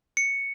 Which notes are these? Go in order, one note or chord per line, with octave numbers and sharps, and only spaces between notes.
C#7